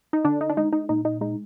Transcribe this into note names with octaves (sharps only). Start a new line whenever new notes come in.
D#4
D3 D4
D#4
D4
G#3 D#4
D#4
A#2 D#4
D#4
G#3 D#4